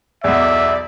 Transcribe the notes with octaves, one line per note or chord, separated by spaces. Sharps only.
B1 E2 D5 E5